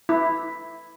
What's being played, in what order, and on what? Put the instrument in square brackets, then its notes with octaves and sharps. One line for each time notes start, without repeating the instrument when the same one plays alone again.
[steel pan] E4